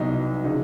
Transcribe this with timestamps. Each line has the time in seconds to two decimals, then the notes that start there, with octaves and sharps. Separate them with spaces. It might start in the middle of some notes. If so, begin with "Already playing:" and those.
Already playing: C2 B2 F#3 D#4
0.15 D#4
0.44 C#3 F3 D#4